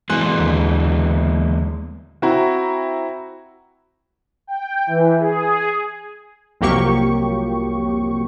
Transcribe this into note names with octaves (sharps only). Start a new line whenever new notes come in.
E3 G#3 A#3 G#5 C6 F#6
D#2 D3
C4 E4 F#4 A#5
G5
E3
G#4
C2 F2 F#3 A#3 G4 C#6